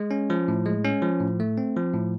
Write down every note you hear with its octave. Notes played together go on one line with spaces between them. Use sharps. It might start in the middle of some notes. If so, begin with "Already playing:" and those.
Already playing: G#3
C#4
F3
A2
G#3
C#4
F3
A2
A3
C4
F3
A2